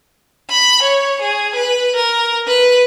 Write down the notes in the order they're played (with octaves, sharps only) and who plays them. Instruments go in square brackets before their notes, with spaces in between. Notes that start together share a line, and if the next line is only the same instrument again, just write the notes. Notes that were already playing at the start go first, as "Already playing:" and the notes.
[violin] B5
C#5
G#4
B4
A#4
B4